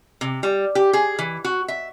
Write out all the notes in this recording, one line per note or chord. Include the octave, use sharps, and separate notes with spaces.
C3
G3
G4
G#4
E3
F#4
E5